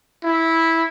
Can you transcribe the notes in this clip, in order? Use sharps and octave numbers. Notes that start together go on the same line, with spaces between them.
E4